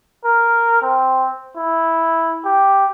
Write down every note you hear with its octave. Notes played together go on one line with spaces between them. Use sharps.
A#4
C4
E4
G4